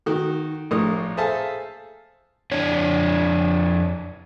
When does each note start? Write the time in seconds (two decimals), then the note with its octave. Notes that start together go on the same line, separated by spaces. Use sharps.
0.06 D#3 F#4
0.71 A#1 A2 A#4 D#6
1.17 G#4 A4 C5 E5 F5 A5
2.52 F2 D4 C#5